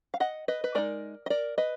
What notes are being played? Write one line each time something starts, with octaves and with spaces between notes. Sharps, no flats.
F5
D#5 F#5
B4 D#5
B4
G#3 D#4 A#4 D5
D#5
A#4 D5
B4 D#5